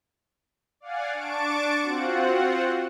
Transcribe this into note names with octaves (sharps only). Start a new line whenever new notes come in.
D5 F5 F#5 G#5
D4 A5 C#6 D6 D7
C4 F4 F#4 F#5